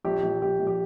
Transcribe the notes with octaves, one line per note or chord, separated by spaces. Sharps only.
A#1 G4
A#1
A#1 G4
A#1
G4